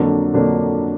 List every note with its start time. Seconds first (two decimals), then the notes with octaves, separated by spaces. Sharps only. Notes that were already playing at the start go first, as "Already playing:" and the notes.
Already playing: F2 D3 F#3 A#3 D4
0.33 F2 D3 F#3 A#3 D4